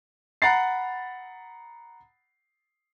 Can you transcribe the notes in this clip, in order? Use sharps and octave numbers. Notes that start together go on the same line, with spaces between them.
F#5 A#5 B5 A6 C7